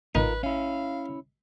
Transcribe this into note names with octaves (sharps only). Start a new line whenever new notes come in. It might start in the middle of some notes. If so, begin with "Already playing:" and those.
A1 D#4 F4 A#4 B4
C#4 E4 F5